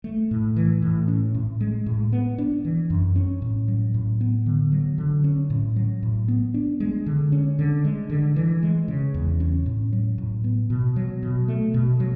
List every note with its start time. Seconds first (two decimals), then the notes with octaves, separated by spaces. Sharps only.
0.04 A3
0.31 A2
0.56 E3
0.82 A2
1.08 C#4
1.35 A2
1.61 G#3
1.86 A2
2.12 B3
2.38 D4
2.65 E3
2.90 F#2
3.16 C#4
3.42 A2
3.68 F#3
3.94 A2
4.21 B3
4.46 D3
4.72 F#3
4.98 D3
5.24 C#4
5.50 A2
5.76 F#3
6.03 A2
6.28 B3
6.54 D4
6.80 G#3
7.06 D3
7.32 C#4
7.59 D3
7.85 G#3
8.10 D3
8.36 E3
8.63 G#3
8.88 C#3
9.14 E2
9.40 C#4
9.66 A2
9.93 F#3
10.18 A2
10.44 B3
10.70 B2
10.96 F#3
11.23 B2
11.48 A3
11.74 B2
12.00 F#3